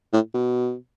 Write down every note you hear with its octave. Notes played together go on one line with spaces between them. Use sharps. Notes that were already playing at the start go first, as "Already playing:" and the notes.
A2
B2